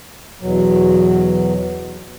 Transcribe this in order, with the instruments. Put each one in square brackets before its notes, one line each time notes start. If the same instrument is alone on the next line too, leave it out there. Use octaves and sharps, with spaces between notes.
[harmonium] E2 B2 F#3